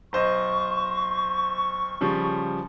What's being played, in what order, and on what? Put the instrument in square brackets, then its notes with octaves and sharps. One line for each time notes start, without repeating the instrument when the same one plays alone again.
[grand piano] B1 C5 D#5 [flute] C#6
[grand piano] C#3 F3 G3